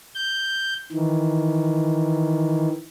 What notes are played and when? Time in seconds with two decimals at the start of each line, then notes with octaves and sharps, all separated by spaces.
0.15 G6
0.92 D#3 E3